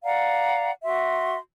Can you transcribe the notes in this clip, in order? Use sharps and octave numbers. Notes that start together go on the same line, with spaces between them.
D5 F5 F#5 A#5
F#4 E5 C6